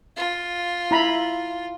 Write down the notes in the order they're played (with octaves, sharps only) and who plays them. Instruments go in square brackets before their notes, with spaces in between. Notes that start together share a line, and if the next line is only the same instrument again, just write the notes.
[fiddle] F4
[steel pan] E4 A#5 B5